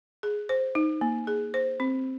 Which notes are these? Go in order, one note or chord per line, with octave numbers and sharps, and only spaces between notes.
G#4
C5
D#4
A#3
G#4
C5
C4